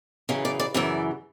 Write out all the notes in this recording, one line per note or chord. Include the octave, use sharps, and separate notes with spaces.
F#2 C#3 E3
D5
D5
F#2 C#3 E3 D5